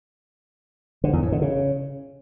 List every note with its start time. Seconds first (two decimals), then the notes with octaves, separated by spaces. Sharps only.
1.04 D3
1.13 E2
1.23 A2
1.32 D3
1.42 C#3